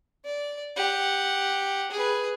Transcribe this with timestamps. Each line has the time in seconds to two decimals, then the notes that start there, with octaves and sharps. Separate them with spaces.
0.25 D5
0.76 G4 F#5
1.91 G#4 B4